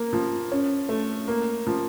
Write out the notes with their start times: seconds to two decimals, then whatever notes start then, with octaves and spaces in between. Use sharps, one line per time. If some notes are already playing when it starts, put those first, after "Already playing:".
Already playing: A#3
0.13 F3
0.52 C#4
0.89 A3
1.28 A#3
1.67 F3